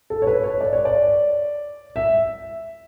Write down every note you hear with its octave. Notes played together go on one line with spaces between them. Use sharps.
A4
C#5
B4
C#5
D5
C#5
D5
E5